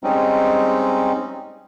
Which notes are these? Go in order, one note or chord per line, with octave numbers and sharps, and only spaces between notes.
G3 G#3 C4 C#4 D#4